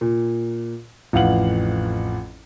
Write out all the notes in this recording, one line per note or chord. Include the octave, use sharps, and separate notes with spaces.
A#2
A1 F2 F5 F#5 F#7